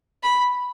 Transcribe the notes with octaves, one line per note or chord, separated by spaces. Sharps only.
B5